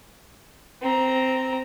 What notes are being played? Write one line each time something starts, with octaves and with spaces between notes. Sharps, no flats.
C4 A#5